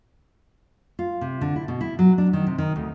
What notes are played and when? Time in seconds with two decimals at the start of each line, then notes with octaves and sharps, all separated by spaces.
0.99 F4
1.21 C3
1.41 D3
1.56 E4
1.68 B2
1.81 E4
1.99 F#3
2.18 D4
2.33 D#3
2.47 C3
2.58 D#3
2.76 D2